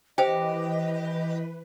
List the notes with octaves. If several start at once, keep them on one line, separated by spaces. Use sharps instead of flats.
E3 G4 B4 C5 D#5 G5